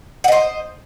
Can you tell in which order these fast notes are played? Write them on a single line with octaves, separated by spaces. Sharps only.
F#5 D#5 C5